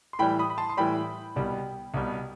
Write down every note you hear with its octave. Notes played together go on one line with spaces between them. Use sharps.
C6
A2 E3 G3 G5 B5
B5 D#6
B5
A5 C6
C6
A2 E3 G3 G5 B5
C2 B2 G3
C2 B2 G3